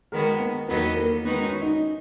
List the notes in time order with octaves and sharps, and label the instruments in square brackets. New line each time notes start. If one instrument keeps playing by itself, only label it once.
[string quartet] D#3 G#3 B3 F#4 [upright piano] A#4
[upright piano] B3
[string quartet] E2 D#3 F#3 B3 D#4 [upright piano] A#3
[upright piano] A#3
[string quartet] D#3 G#3 D#4 F#4 B4 [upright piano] B3
[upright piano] C#4
D#4